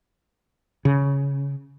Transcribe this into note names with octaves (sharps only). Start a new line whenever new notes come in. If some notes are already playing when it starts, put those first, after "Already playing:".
C#3